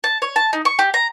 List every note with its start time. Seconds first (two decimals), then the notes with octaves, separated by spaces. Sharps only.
0.04 A5
0.22 C#5
0.36 A5
0.53 D#4
0.65 C#6
0.79 G4
0.94 A#5